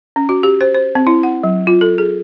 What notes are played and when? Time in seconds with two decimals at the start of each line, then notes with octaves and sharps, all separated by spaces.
0.16 C#4
0.29 F#4
0.43 G4
0.61 C5
0.74 C5
0.95 C4
1.07 E4
1.23 F#5
1.43 F#3
1.67 F4
1.81 A4
1.98 G#4